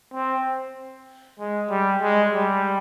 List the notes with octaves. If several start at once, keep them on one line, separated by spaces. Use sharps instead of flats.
C4
G#3
G3
G#3
G3